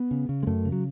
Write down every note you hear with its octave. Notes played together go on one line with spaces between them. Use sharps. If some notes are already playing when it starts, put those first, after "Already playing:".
Already playing: B3
C#3
C#3
G#3
F#2 A3
C#3
F#3